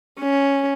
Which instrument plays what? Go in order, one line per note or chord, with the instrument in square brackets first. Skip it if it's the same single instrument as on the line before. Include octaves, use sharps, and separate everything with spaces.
[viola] C#4